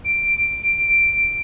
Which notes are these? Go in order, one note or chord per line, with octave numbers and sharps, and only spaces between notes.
D7